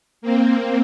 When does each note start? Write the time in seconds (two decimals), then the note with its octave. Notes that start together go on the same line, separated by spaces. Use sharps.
0.22 A#3 C4